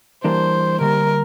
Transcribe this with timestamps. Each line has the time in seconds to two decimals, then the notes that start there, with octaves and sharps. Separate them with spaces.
0.24 E3 G3 A#3 D4 C5
0.81 D3 G3 A#3 A#4